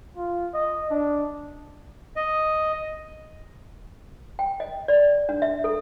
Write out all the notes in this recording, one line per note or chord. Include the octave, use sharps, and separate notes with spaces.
F4
D#5
D4
D#5
G5
D#5
D5
D4
E5
A4